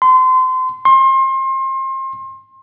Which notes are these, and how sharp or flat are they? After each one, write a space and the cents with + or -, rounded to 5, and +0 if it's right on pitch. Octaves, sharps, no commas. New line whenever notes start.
C6 -30
C6 +30